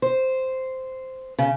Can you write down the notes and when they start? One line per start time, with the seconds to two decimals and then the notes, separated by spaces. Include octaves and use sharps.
0.02 C5
1.39 C#3